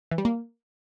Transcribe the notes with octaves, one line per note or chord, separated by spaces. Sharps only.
E3
G3
A#3